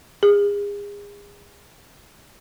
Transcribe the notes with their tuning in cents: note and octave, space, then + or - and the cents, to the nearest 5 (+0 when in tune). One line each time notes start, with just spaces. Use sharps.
G#4 -35